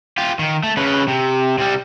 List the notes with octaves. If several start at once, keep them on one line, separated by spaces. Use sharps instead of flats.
F4 G4
D#3
A3
C#3 B4
C3
C3 G3